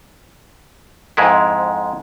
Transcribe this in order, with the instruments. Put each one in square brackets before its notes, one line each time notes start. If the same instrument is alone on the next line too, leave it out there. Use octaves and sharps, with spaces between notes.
[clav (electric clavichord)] F2 G#2 G#3 E4